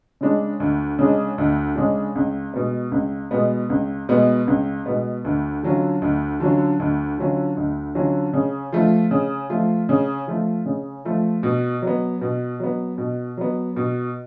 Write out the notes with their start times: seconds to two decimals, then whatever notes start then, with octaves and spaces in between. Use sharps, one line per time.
0.21 C#3 G#3 D4
0.60 D2
0.99 C#3 G#3 D4
1.38 D2
1.76 C#3 G#3 D4
2.15 C#2
2.54 B2 G#3 B3
2.92 C#2
3.31 B2 G#3 B3
3.70 C#2
4.09 B2 G#3 B3
4.47 C#2
4.86 B2 G#3 B3
5.25 D2
5.63 D3 F#3 C#4 F4
6.02 D2
6.40 D3 F#3 C#4 F4
6.80 D2
7.18 D3 F#3 C#4 F4
7.57 D2
7.95 D3 F#3 C#4 F4
8.33 C#3
8.72 F3 A3 F4
9.11 C#3
9.50 F3 A3 F4
9.89 C#3
10.27 F3 A3 F4
10.66 C#3
11.05 F3 A3 F4
11.43 B2
11.82 F#3 B3
12.21 B2
12.60 F#3 B3
12.98 B2
13.37 F#3 B3
13.76 B2